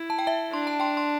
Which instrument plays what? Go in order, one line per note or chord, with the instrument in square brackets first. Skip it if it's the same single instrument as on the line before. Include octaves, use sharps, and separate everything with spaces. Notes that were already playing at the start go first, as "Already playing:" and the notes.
Already playing: [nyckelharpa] E4
[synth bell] A5
G5
E5 A5
[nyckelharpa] D4 [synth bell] C6
[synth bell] A5
G5 C6
C6